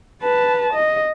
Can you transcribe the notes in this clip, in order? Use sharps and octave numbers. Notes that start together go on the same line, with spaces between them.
B4 A5
D#5